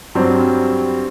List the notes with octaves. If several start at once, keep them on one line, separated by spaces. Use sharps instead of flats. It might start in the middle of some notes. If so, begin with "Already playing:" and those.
G2 F#3 G3 C4